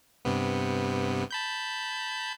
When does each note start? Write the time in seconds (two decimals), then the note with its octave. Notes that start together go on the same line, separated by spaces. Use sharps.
0.25 G2 C3 B3
1.31 A5 B5 G6